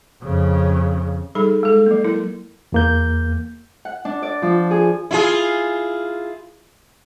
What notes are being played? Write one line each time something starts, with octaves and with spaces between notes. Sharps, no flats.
F2 C#3
G3 D#4 G#4 A4 B5
G#3 A4
F#3 A#3
E4 A#4
E2 A#3 G6
F#5
D4
D5
F3
G#4
E4 F4 G#4